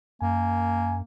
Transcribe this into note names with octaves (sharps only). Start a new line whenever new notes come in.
F#2 A#3 G#5